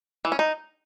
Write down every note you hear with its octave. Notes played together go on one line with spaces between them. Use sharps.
E3
C#4
D#4